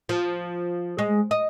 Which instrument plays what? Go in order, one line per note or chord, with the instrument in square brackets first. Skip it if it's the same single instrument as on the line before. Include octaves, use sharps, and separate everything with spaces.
[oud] F3
G#3
D#5